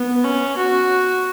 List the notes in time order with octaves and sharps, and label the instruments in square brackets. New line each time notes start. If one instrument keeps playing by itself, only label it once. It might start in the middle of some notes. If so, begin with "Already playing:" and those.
Already playing: [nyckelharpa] B3
C#4
F#4